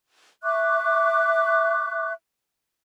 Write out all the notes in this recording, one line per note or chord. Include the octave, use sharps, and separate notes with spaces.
E5 C#6 D6 F#6